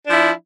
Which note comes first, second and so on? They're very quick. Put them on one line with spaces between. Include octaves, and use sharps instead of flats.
D4 F3 E4